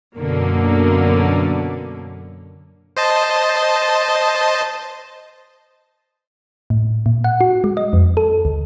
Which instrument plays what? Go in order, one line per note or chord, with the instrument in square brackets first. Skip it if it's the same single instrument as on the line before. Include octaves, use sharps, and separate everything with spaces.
[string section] F#2 B2 D3 A#3
[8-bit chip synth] C5 D#5 A5
[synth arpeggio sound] A2
A#2
F#5
F#4
G#3
D#5
F2
A4
D2